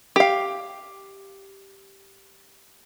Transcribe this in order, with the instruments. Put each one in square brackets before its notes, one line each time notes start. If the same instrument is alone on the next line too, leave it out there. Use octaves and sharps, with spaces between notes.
[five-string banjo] G4 F5